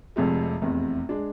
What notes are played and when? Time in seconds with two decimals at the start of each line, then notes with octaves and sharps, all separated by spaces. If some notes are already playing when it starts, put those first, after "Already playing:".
0.16 F1 F2 C3 G#3
0.62 F1 E2 C3
1.09 G#3 D4